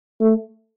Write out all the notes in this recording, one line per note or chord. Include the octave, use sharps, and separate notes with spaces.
A3